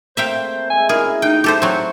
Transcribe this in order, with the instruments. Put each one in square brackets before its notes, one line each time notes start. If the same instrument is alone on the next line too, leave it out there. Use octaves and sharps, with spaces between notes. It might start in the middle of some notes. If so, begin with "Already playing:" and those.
[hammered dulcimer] A3 A#3 C4 [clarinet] C5 [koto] E5 F5 G5
[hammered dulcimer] G#3 E5 [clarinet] G#5
[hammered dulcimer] C#4 E4 F#4 [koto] G#4 [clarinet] A#4
[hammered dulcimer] A3 [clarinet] D#4 [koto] G5
[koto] G4 A4 C5
[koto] F#3 C4 [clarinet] C#6